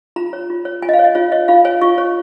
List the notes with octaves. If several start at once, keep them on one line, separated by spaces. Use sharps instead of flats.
F4 A#5
C#5
F4
C#5
F4 G#5
D#5
F5
C#5 D#5
F4 C#5
C#5 D#5
F4 F5
C#5 G#5
F4 C#6
C#5